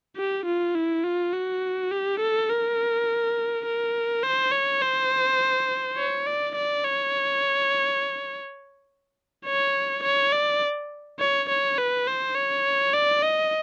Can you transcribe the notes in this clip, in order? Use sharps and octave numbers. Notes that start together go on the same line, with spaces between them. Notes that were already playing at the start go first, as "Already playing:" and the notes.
G4
F4
E4
F4
F#4
G4
A4
A#4
A#4
C5
C#5
C5
C#5
D5
D5
C#5
C#5
C#5
D5
C#5
C#5
B4
C5
C#5
D5
D#5